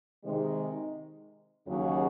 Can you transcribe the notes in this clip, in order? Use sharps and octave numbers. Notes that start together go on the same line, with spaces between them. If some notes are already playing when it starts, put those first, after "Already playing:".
C3 D#3 G#3
D#2 C#3 F#3